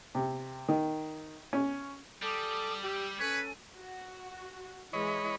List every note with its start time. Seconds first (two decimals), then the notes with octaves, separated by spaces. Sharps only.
0.15 C3
0.68 D#3
1.53 C#4
2.23 G3 A4 G#5 D6 D#6
2.83 G4 E6
3.20 C#4 A4 B4 C#5 G#5 B5
3.76 F#4
4.93 E3 G#3 C#5 D#5 B5